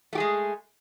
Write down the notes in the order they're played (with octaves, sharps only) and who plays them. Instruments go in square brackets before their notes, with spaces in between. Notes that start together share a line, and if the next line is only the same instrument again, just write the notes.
[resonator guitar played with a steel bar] A3
G4
G#4
G#3